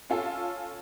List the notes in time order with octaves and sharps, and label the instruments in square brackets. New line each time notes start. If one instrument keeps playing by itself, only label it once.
[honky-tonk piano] C#4 F4 A4